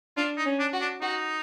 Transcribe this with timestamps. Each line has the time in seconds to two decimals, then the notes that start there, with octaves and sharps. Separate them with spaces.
0.17 D4 F4
0.37 D#4
0.45 C#4
0.60 D4
0.73 F#4
0.81 D4
1.01 D#4 F#4